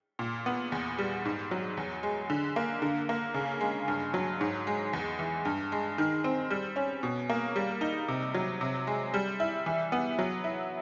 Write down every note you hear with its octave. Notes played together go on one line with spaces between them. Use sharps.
A#2
B3
E2
G3
G#2
F#3
E2
G#3
D3
A#3
D3
A#3
C#3
G#3
G2
F#3
G#2
G#3
E2
E3
G2
G#3
D#3
C4
G3
C#4
B2
A#3
G3
D#4
C3
F#3
C3
G#3
G3
E4
E3
B3
F#3
E4